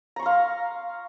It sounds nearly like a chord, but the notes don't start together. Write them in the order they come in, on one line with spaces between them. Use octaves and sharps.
A#5 C#6 C6 F5